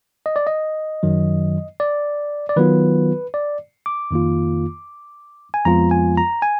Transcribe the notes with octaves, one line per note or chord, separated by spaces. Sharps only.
D#5
D5
D#5
F#2 D#3 F#3
D5
D5
D#3 F#3 B3 F4 B4
D5
D6
F2 D#3 A#3 F4
G#5
F2 F3 G#3 B3 F4 A#5
G#5
A#5
G#5